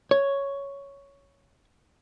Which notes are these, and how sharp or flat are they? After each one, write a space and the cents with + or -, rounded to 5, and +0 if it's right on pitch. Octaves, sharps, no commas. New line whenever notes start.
C#5 +5